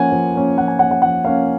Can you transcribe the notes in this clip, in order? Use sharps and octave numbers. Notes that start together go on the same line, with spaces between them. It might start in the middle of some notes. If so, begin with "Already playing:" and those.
Already playing: F3 A#3 C#4 F#5 G#5
F3
A#3 C#4
F3 F#5
G#5
A#3 C#4 F#5
F#5
F3 F#5
A#3 C#4 F5